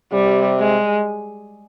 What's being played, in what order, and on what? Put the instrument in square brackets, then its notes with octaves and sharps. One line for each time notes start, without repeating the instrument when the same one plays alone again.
[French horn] C3 [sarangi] G3
[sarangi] G#3